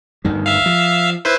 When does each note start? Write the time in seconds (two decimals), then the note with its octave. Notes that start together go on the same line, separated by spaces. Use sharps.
0.25 G1 D2 D#3
0.46 E5 F5
0.66 F3
1.25 E4 B4 C5